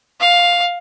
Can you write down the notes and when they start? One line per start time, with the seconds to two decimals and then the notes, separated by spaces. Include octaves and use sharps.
0.20 F5